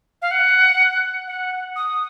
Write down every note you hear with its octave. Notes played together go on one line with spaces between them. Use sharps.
F5
F#5
F#5
D#6